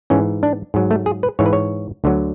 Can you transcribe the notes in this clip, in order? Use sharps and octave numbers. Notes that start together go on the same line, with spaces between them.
G#2 E3 C#4
D4
G#2 F#3
A3
G#4
B4
G#2 E3 C#5
B4
C#5
D2 D3 F#3